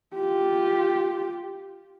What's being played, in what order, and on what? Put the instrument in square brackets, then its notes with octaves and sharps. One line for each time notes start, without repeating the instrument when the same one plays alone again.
[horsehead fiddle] F4 G4